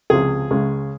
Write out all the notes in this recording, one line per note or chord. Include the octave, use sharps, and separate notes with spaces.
C#2 C3 F3 G#4
C#2 C#3 G#3